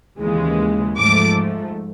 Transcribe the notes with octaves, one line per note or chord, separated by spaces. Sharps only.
D#2 C#3 E3 G#3
G#2 F3 A3 D6